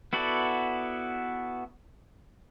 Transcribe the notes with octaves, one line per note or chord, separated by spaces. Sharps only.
B3 E4 F#4 A4 D5